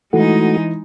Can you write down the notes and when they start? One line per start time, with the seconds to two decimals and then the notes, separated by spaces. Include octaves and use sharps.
0.13 E3 G#3 A3 D#4 F#4